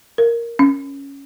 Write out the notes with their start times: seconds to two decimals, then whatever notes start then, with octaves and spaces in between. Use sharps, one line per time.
0.18 A#4
0.59 C#4